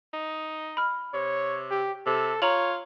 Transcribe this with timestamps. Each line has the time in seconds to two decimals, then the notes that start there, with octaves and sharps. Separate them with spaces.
0.13 D#4
0.77 B5 F6
1.14 C3 C#5
1.71 G4
2.06 C3 A4
2.42 F4 C#5 A#5 F7 F#7